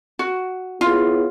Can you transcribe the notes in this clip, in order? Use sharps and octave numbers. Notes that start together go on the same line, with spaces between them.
F#4
B3 E4 F4 G#4 C#5